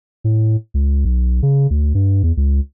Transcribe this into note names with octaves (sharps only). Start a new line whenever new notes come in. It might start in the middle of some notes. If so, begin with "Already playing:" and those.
A2
C#2
B1
C#3
D2
G2
E2
C#2